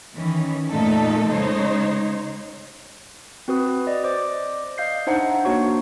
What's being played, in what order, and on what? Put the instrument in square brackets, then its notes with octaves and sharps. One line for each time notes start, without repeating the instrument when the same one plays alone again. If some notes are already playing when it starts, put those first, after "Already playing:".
[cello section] D#3 E3 C#4
F2 A#2 A3 D#4 A4
C#3 G#3 D#4 C5 C#5
[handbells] C4 F#4 B4 D#6
D5 D#5
C5 D5 D6
D#5 F5 G6 C7
D4 D#4 C5 E5 F#5 A#5
A#3 D4 F#4 C#5 C#6